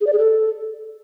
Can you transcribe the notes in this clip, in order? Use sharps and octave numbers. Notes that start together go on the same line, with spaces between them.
G#4
D5
G#4
A4